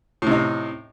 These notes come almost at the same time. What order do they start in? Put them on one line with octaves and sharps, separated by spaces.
A2 C3 D#4